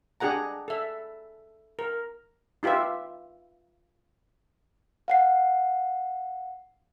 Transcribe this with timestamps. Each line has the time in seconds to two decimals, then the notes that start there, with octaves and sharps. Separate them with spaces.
0.20 D4 G4 G#4 F#5 A#5
0.68 A4 E5
1.79 A#4
2.63 D#4 F4 G4 B4 E5
5.08 F5 F#5 C7